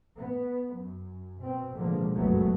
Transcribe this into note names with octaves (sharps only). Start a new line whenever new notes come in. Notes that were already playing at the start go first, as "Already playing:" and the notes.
B3
F#2
B2 C4
A1 B2 D3 F3 G#3 A#3
G1 C#2 F#2 F#3 A3 B3